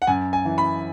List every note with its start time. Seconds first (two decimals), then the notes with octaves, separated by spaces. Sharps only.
0.02 F#5
0.07 F#2 G#5
0.33 G#5
0.45 E3
0.58 B5